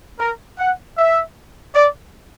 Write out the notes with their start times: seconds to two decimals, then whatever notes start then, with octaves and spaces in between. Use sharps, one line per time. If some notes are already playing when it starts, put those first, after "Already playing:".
0.19 A#4
0.58 F#5
0.96 E5
1.73 D5